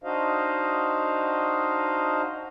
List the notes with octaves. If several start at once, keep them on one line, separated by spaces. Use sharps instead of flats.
D4 D#4 F#4 C5 D#5 F5